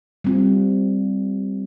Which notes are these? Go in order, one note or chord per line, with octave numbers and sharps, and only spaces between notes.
G3 C4 F4